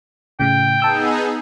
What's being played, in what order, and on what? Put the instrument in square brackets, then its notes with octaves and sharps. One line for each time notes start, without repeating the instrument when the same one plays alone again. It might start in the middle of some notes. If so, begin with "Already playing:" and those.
[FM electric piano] A2 C#3 [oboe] G5
[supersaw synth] B3 D#4 G#4 [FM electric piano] A5 E6 G6